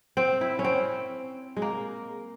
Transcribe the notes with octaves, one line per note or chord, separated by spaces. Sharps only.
C4
E4
C#4
C4
G#3
A#3